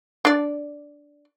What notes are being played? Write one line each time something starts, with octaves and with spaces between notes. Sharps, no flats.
D4 D5